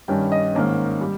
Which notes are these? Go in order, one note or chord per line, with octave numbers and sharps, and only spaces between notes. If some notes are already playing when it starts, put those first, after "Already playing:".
G2 D#3 G3 C#4 G5
D#5
G#2 D#3 A#3 C#4
G3